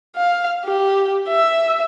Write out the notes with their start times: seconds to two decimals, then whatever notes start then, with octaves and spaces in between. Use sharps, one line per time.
0.16 F5
0.65 G4
1.28 E5